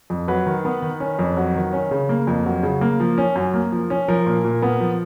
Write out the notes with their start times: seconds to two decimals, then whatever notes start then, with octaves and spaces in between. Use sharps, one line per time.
0.10 F2
0.28 F#3 B4
0.46 D#3
0.65 B3
0.82 D#3
1.00 C#4
1.19 F2
1.37 F#3
1.55 D#3
1.73 C#4
1.91 C#3
2.09 A#3
2.27 F2
2.45 F#3
2.63 C#3
2.81 A#3
3.00 F3
3.18 C#4
3.36 F#2
3.54 A#3
3.72 F3
3.90 C#4
4.08 F3 A#4
4.26 A#2
4.45 A#2
4.62 B3
4.81 F3